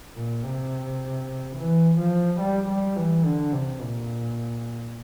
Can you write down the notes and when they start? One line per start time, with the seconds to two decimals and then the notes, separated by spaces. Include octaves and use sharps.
0.16 A#2
0.44 C3
1.56 E3
1.98 F3
2.40 G3
2.69 G3
2.97 E3
3.25 D3
3.53 C3
3.81 A#2